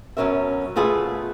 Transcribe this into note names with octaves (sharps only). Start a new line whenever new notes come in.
F#2 B2 F3 C#4 A#4 E5
B2 A3 F4 G#4 A4 B4